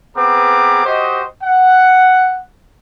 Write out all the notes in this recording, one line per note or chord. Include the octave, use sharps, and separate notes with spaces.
B3 C4 G#4 A#4 B4 D6
F#4 G4 C5 D#5
F#5